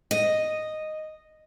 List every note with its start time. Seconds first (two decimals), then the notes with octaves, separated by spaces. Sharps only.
0.11 D#5